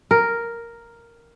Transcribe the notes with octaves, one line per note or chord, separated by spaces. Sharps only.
A#4